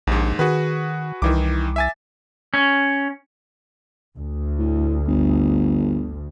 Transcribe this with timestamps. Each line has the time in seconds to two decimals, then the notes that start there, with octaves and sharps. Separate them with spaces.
0.07 A#1 D#2 G#2
0.39 D#3 F#4 G#4 B4
1.22 C2 D#3 E3 D6
1.76 E5 G#5 A6
2.54 C#4
4.17 D2
4.59 A2
5.08 G1